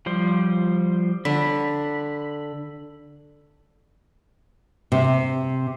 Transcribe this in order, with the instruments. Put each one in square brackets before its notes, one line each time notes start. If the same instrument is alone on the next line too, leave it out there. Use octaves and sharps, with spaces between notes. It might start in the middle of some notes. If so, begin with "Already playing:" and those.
[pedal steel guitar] F3 G3 C5
[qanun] D3 [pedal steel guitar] B5
[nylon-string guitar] C3